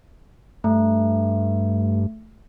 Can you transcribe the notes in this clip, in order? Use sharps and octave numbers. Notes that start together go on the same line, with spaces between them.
G2 A3